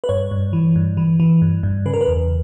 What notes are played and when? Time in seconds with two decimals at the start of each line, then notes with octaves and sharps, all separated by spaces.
0.04 B4
0.09 G2 C#5
0.31 G2
0.53 E3
0.76 G2
0.97 E3
1.20 E3
1.42 G2
1.63 G2
1.86 C#3 B4
1.94 A#4
2.01 B4
2.08 E2